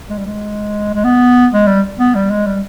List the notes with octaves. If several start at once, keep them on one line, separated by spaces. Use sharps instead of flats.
G#3
G3
G#3
G#3
B3
G#3
G3
B3
G3
G#3
G3